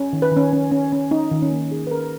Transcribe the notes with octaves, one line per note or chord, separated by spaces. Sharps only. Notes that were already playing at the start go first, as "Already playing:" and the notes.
Already playing: C#4
D#3
B4
D#3 C#4
C#4
C#4
C#4
C#4 D#4
D#3
C#4
A#3
C#4 G#4
B4
C#4 A#4